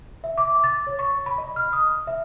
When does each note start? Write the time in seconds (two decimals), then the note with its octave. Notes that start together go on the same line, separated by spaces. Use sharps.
0.24 E5
0.38 D6
0.64 A6
0.87 C#5
0.99 C#6
1.26 B5
1.38 D#5
1.56 F6
1.73 D#6
2.07 E5